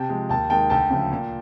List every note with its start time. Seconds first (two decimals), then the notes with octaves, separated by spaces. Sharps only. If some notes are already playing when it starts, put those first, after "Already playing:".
Already playing: C3 G5 A5
0.09 F3 G#3
0.29 D#2 G5 A5
0.50 D#3 G#3 G5 A5
0.70 D2 G5 A5
0.90 C#3 F3 A3
1.12 A#2